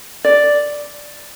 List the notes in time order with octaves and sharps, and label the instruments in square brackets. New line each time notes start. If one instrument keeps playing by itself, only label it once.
[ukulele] D5